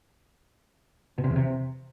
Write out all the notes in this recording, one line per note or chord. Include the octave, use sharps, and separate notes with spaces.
B2
C3
E2
C3